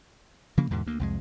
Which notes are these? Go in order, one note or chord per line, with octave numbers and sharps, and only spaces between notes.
C#3 F3 A#3
E2 G#2 B2 D3
D2 A#3
C2 F2 G#3